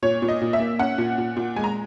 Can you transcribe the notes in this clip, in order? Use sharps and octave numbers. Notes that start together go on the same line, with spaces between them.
A#2 C#5
A#2
D#5
A#2
E5
A#3
C#4 F#5
A#2
A#2
A#2
G#3 G#5
A#5